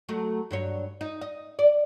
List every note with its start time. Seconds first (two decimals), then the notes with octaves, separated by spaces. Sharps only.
0.09 F#3 A3
0.51 G2 F#3 C#5
1.01 D#4
1.21 D#5
1.59 D5